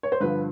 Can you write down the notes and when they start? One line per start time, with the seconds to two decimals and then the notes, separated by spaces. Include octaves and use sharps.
0.03 C#5
0.12 C5
0.21 G2 D3 F3 B4